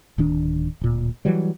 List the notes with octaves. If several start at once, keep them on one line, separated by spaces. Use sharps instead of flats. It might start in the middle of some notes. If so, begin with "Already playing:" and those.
D1 D#3 D4
D1 A#2
E3 F#3 G3